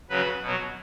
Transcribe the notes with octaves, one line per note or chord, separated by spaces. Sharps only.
C#3 F#3 B4
B2 F#3